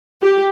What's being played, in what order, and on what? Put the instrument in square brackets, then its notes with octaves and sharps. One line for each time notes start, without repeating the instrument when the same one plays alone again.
[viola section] G4